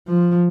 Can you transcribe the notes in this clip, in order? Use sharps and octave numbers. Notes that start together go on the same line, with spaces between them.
F3